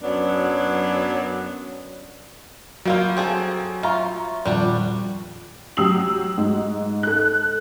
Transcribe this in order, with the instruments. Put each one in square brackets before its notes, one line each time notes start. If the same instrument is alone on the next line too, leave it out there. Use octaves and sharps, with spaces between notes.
[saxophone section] F#2 F#3 B3 D4
[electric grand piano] F#3 [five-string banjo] G3 A#3 F4 [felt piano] F#4 G6
[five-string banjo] C4 G#4 A4
[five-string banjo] F4 [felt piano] E5 A#5 C#6
[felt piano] D#1 F2 [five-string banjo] G3 D4 F#4
[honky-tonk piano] F#3 G4 D#6 E6 C7 F#7
G#2
A4 F#6